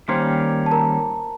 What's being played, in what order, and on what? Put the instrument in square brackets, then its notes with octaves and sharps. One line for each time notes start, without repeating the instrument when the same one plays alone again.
[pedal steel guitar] D#3 G3 A#3 C#4 [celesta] C5 C6
[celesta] A5
A#4 A#5